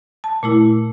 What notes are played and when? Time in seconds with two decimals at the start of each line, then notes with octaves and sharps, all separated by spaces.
0.24 A5
0.43 A#2 A3 E4